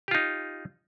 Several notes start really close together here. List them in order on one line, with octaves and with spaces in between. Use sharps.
G4 F4 D#4